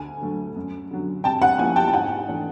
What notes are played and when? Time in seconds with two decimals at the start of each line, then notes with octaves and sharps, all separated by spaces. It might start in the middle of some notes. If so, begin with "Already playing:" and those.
Already playing: D2 G#5
0.22 D3 F#3 A3
0.56 F#2
0.91 D3 F#3
1.24 C3 G5 A5
1.42 F#5 G#5
1.58 F3 A#3 C#4 E4 F#5 G#5
1.76 G5 A5
1.88 A5
1.93 G#2 F#5 G#5
2.28 E3 A3 D4